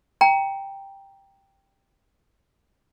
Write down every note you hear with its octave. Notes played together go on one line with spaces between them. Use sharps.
G5 A#5